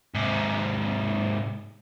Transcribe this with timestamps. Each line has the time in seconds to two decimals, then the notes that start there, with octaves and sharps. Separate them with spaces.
0.15 G#2 C3